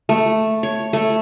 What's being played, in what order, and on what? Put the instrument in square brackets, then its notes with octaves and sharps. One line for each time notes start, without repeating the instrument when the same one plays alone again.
[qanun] A3
C#5
A3